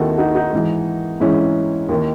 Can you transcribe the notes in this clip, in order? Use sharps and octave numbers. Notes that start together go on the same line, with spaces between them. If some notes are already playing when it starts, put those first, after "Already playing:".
Already playing: D#2 D#3 E4 F#4 A4
D#4 F#4
D#4 F#4
G#2 E3
G#2 E3 C#4 E4
D#2 D#3